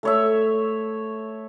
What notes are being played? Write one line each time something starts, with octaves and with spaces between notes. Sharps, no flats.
A3 C#5 E5